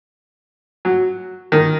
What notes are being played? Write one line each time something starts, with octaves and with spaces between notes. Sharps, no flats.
F#3
D#3